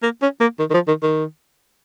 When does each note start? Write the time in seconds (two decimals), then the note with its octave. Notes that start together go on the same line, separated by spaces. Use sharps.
0.03 A#3
0.22 C#4
0.41 A#3
0.59 D#3
0.70 D#3
0.74 F3
0.88 D#3
1.03 D#3